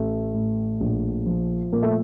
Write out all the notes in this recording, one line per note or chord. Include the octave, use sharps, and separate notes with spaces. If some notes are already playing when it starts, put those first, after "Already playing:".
Already playing: A1 A3
A2
A#1
F3
A#2 A#3
A3